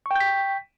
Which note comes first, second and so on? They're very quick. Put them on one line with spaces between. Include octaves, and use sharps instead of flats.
C#6 G5 G6 B6